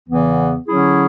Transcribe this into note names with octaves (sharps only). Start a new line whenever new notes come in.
E2 C#3 E3 B3
D3 F#3 C#4 E4 G#4